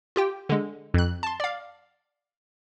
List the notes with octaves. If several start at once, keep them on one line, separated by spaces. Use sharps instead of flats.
F4 G4 G5
D3 G#3
F2 F#6
A5 C6
D5 F5